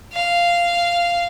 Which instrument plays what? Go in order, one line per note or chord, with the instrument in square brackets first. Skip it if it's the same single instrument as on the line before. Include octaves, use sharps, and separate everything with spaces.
[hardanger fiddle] F5